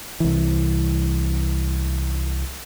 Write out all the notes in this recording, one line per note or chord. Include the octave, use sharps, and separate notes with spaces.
C2 E3